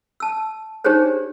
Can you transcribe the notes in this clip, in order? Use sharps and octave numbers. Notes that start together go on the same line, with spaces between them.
A5 E6
D4 D#4 G4 G#4 C5 C#5